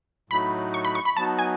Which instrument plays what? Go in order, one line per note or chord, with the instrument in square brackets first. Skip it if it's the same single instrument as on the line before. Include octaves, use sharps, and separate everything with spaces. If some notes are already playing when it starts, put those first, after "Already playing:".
[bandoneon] A2 F#3 A3 D#4 F#4 [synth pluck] B5
[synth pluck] C#6
B5
C#6
B5
[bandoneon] F#3 B3 D#4 F#4 [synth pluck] A5
[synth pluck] G#5